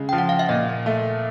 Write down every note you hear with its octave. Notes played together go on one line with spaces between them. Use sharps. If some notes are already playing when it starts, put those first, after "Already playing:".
Already playing: C#3 G#3
F3 G5
F#5
F5
E5
A#2 D#5
A3